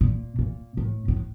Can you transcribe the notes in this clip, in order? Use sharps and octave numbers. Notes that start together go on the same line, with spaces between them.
A#2
A#2
A2
A2